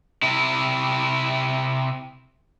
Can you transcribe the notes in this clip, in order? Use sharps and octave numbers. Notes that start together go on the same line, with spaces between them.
C3 E4